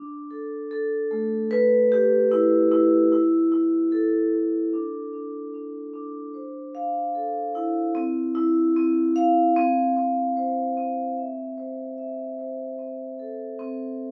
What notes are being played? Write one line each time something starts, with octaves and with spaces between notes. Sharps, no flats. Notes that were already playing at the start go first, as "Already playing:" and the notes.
Already playing: D4
A4
A4
A3
B4
G4
E4
E4
E4
E4
A4
A4
D4
D4
D4
D4
C5
F5
A4
E4
C4
E4
C4
F5
C4
C4
C5
C4
E5
C5
E5
C5
C4
A4
C4